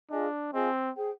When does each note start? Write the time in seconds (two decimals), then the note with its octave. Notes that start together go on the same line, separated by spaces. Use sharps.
0.10 D4 F4 G#4 D#5 G#5
0.53 C4 F4 G#4 D#5 G#5
0.95 G#4 C5 G5